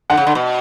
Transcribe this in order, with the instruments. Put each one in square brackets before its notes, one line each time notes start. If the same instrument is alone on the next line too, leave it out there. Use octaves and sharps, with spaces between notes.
[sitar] D3 [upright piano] F#5
[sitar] C#3
D3
B2